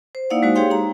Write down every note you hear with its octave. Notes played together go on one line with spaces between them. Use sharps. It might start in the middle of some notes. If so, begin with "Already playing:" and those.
C5
A#3 D#4 E4 D5 F5 F#5
G#3 D#4 F#4 C5
G4 G#4 C#5 F5 G5 C6
D#4 A#5